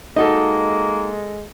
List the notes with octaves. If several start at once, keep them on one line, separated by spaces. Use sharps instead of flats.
G#3 A#3 D#4 F#4 A4 D#5